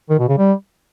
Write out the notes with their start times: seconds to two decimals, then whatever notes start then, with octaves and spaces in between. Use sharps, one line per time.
0.10 D#3
0.19 B2
0.29 C#3
0.38 G3